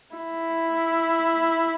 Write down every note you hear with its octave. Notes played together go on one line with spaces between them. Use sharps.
E4